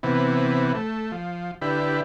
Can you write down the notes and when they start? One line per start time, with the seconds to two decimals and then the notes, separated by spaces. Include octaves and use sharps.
0.03 C3 E3 B3
0.75 A3
1.12 F3
1.62 D3 E4 G4 B4